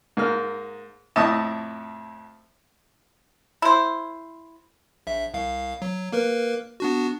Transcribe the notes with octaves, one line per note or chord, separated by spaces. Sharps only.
G#2 A#3 F6
F2 A2 D#5 E5 A5 D#6
E4 C5
A#1 E5
C2 F5
F#3
A#3 A#4 B4
B3 D4 F#4